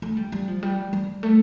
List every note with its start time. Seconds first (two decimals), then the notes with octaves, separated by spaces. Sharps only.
0.02 A3
0.17 G3
0.32 G3
0.48 F3
0.63 G3
0.93 G3
1.23 A3